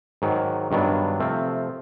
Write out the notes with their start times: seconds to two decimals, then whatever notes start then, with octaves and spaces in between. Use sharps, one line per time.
0.22 G#2 D#3 F#3
0.71 G2 D#3 F#3 B3 D4
1.20 C3 F3 A3 C4